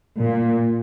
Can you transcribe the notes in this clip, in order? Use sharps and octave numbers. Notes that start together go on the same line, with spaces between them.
A#2